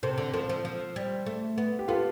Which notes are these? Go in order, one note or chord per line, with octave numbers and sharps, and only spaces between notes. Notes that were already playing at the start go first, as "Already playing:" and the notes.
C3 A4 C5
D3
F3 A4 C5
F3
F3
G3
A3
B3
G4
B3 F4 A4